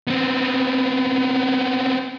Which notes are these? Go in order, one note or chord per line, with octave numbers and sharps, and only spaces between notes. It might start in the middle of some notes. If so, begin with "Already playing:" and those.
B3 C4